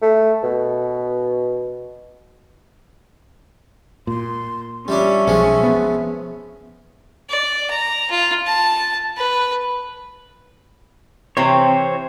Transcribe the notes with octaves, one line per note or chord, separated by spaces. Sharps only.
A3
B2
A#2 C6
G3 C#4 D4 E5
B1 F3 G#3
B3
D5
A#5
F4
A5
B4
C3 E3 C4 C5 C#5